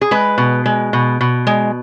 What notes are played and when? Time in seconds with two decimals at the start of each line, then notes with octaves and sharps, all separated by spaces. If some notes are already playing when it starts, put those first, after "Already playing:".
0.01 G#4
0.11 G#3 B4
0.38 B2
0.66 G#3
0.93 B2
1.21 B2
1.47 G#3